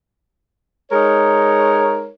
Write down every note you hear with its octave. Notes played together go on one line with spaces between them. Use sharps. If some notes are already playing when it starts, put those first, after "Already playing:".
G#3 D#4 A#4 C#5